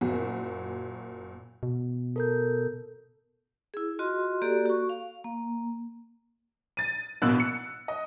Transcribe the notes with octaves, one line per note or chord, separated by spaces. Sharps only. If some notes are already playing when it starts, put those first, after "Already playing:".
F#1 A#2 A#3 F#4 G#5
B2
A4 A#4 G6
E4 G#4
F4 F#4 D#5 C6
A#3 F#4 G4 A4 D5
F#4 C#6
F5
A#3
A6 D#7
A1 B2 A#3 E6 F#6
C#7
D#5